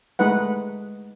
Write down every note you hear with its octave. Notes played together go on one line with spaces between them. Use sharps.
G#3 A3 D#4 B4 F#5